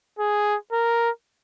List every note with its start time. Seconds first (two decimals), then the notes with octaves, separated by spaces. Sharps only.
0.19 G#4
0.72 A#4